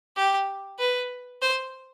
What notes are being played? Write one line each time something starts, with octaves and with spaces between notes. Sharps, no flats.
G4
B4
C5